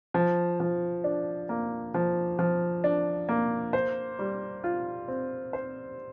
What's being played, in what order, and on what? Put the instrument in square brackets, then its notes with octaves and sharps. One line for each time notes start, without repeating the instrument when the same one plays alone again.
[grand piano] F3
F3
D4
A#3
F3
F3
D4
A#3
C5
G3
F4
C4
C5